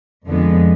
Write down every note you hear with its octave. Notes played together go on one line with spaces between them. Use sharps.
F2 D3 F3 G#3 B3